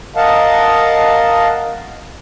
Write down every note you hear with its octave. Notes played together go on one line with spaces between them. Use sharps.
A#4 D#5 F5 F#5 A5